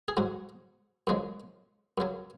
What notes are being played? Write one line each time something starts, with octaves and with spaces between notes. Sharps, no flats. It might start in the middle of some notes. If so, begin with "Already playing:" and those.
G#4
G#2 F#3 F#4
F#2 C#3 F3 G#3
F#2 C#3 F#3